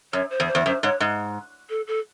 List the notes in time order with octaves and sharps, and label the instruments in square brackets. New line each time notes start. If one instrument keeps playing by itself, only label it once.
[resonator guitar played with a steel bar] F#2 [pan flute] C#5
[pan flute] C5
[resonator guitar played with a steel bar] E2
[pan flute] C5
[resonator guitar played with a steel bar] E2
[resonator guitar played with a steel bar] F#2 [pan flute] C5
[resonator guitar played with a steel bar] G#2 [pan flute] C#5
[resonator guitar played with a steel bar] G#2
[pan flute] A4
A4